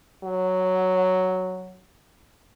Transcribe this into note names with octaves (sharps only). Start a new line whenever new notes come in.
F#3